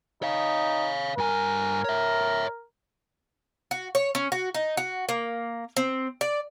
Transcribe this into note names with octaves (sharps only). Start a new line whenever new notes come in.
D#4 C#5 F5
G2 A#4 G#5
C#5 E5
F#4
C#5
C#4
F#4
D#4
F#4
A#3
C4
D5